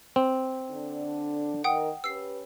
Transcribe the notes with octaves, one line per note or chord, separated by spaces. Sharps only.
C4
D3 D4
D#3 A#4 F#5 G5 D#6
C#4 G4 B4 E6 C7